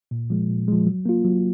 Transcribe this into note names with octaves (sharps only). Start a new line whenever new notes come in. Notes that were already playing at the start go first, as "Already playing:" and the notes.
A#2
F3 G#3
A#2
F3 G#3
F#3
A#3 F4
F#3